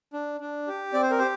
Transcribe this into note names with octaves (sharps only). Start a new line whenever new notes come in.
D4
D4
G4
C4 D5
C5
A#4
G4 C5